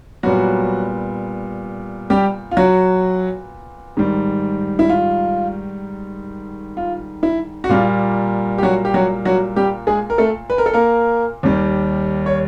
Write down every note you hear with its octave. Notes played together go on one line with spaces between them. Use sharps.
A#2 F#3 G3 B3 F#4
G3 G4
F4
F#3 F#4
G#2 D#3 G3
E4
F4
F4
E4
F#4
A#2 G3 A#3 F4
G4
F#3 F#4
G4
F#3 F#4
F#3 F#4
G3 G4
G#3 G#4
A#4
A3 A4
B4
A#4
A4
A#3 A#4
D#2 D#3 G3
C#5